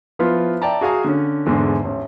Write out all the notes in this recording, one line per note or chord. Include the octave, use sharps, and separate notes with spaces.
F3 B3 E4 F4
D5 E5 G5 A5 A#5
F#4 G#4 F5 G#5 A#5
D3 C#4
E2 G#2 D3
A1